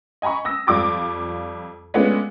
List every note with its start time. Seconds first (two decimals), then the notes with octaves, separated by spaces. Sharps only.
0.22 D#5 G#5 A#5 B5 C#6
0.45 D#6 E6 A#6
0.67 F2 G3 F4 D6 D#6 A6
1.94 G#3 A3 B3 C#4 D4 F4